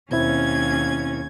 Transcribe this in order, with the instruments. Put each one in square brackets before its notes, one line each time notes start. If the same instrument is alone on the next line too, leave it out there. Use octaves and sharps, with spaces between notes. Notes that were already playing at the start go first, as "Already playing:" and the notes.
[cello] D#2 C#4 [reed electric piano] B2 C4 E4 [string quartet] G#6